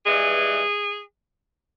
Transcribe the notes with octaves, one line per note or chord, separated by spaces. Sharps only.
G2 E3 G#3 G#4